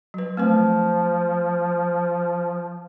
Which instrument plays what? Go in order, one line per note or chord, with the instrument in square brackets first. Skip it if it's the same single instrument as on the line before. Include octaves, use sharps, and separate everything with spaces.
[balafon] F#3 B4
[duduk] F3 [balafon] A3 C4 B4